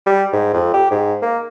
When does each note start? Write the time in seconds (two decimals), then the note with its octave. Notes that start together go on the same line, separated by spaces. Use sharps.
0.06 G3
0.33 G#2
0.53 F2
0.74 G4
0.91 G#2
1.22 A#3